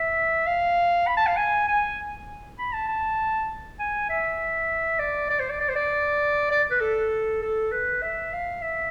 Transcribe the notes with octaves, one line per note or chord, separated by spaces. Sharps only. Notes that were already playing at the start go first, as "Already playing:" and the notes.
Already playing: E5
F5
B5
A5
F5
G#5
G#5
B5
A5
A5
G#5
E5
D5
D5
C5
D5
D5
C5
D5
D5
B4
A4
A4
B4
E5
F5
E5